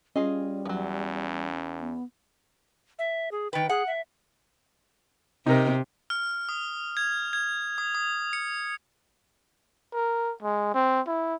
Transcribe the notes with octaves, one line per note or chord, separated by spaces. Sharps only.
G3 C#4 F4 G#4 D#5
E2 F3 F#3
B3
E5
G#4
D#3 B4 G5
G#4 F#5
E5
C3 D#4 A#4
F6
D#6
G#6
G#6
D#6
D#6
C#7
A#4
G#3
C4
E4